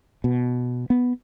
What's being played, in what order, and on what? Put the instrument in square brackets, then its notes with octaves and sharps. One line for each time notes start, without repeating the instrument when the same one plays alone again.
[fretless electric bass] B2
B3